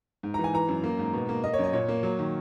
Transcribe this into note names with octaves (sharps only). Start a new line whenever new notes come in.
G#2
E3 A#5
G#5
E3 A#5
F#2
A#3
G#2
B2
A#3
A#3 D#5
C#5
F#2 D#5
A#2 C#5
A#3
F#3
D#3